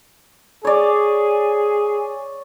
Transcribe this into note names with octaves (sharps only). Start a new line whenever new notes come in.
G#4 C#5 D5